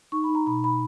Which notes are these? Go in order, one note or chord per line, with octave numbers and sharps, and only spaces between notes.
D#4 C#6
B5
D#4
A#5
B2 B5
B2 B5